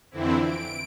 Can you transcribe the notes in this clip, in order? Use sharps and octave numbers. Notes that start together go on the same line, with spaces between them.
F2 D3 E3 C4 E4
D7